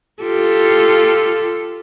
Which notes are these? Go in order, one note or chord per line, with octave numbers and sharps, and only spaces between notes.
F4 G4 A4